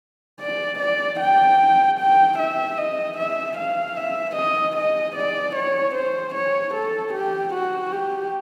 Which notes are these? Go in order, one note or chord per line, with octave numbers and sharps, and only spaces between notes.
D5
D5
G5
G5
E5
D#5
E5
F5
E5
D#5
D#5
D5
C#5
C5
C#5
A4
G4
F#4
G4